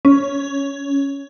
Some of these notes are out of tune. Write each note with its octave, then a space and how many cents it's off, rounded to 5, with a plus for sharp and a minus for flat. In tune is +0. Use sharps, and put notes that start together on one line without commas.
C#4 +10